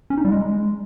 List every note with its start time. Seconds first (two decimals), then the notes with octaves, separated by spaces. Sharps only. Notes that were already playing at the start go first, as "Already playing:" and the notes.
0.10 C#4
0.17 D#4
0.25 G3
0.32 G#3